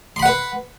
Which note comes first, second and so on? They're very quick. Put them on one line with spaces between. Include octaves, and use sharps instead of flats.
C6 B5 F#5 B4